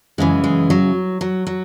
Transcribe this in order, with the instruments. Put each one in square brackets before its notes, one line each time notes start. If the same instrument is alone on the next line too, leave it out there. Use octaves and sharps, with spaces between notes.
[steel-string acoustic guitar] F#2 C#3 E3 G#3
G#3
F#3
F#3
F#3